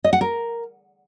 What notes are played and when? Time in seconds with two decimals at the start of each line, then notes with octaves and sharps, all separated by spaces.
0.04 D#5
0.13 F#5
0.21 A#4